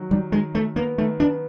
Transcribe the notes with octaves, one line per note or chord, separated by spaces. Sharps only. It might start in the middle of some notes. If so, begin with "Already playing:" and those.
Already playing: D#3 F#3
D#3 G3
D#3 G#3
D#3 A3
A#3 B3
D#3 A3
B3 D4